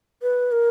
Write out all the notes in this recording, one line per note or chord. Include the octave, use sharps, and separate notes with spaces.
B4
A#4